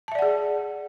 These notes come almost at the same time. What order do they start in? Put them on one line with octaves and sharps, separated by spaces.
A5 E5 D5 F#5 G#4